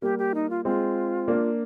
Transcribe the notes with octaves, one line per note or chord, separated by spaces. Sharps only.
G3 A#3 G4
G4
D#4
F4
G#3 C4 F4
A#3 D4